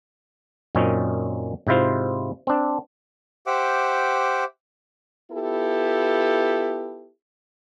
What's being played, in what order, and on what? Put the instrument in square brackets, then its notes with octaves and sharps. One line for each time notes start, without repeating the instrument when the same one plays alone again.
[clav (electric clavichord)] F#2 A#2 C4 C#4 D#4
G#2 C3 E4 F4 C5
C4 D4
[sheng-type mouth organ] G4 C5 E5 F#5 D6
[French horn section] B3 E4 F4 G4 A4